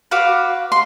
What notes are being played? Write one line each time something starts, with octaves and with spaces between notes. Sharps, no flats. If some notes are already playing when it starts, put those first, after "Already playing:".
F#4 B4 F5 D6
C6